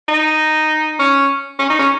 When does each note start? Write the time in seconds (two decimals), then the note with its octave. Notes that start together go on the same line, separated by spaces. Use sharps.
0.08 D#4
0.99 C#4
1.59 C#4
1.70 D#4
1.79 C#4